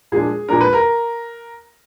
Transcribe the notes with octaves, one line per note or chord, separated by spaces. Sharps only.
A#2 F3 G#3 D4 G#4
A#2 F3 G#3 D4 A#4
B4
A#4